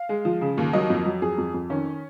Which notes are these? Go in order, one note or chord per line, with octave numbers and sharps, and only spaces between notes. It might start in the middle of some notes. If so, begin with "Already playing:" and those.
Already playing: F5
G#3
F3
C#3
D#2
F#3 D#5
F2
F#3
F2 G#4
F2
F2
D#3 C#4